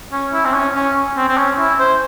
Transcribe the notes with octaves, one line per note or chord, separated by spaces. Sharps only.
C#4
E4
C4
C#4
C#4
C4
C4
C#4
E4
C5